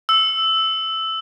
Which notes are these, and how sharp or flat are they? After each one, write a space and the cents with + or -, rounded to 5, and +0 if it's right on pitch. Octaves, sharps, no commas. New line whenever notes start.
E6 -5